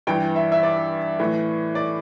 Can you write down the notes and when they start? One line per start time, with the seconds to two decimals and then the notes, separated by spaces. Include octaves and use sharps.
0.07 G2 E3 G5
0.36 E5
0.52 E5
0.63 D5
1.19 A2 E3
1.75 D5